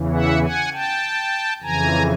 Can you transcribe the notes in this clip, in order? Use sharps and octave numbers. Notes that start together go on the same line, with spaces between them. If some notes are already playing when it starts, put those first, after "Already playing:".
Already playing: E2 C#3 E3
E5 F#5
F#5 G#5
G5 A5
F2 C#3 E3 G#5 A#5